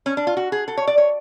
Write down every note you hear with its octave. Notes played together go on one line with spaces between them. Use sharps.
C#4
D4
F4
F#4
G#4
A4
C#5
D5
C#5